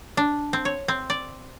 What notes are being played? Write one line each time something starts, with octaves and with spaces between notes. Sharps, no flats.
D4
C4
C#5
C4
D5